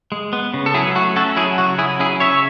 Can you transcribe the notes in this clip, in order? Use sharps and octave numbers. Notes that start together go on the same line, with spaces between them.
G#3
B3
C#3
A4
F#3 E4 G#4
A3 F#4
C#4 F#4 A4
F#3 E4 G#4
C#3 F#4
F#3 E4 G#4
C#4 E4 G#4
C#3 C#5 E5